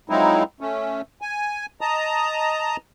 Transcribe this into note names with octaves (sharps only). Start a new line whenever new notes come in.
F3 F#3 G#3 C4 D#4 E4
A3 C#4
G#5
D#5 A5 A#5 D#6